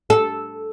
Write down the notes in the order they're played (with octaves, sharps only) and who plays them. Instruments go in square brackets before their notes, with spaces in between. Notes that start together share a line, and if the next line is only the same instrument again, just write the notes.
[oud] A4